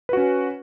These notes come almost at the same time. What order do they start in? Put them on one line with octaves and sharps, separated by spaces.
B4 F#4 C#4